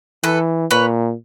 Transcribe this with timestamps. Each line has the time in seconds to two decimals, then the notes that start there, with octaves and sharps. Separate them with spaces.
0.23 E3 A4 B4
0.71 A#2 B4 C#5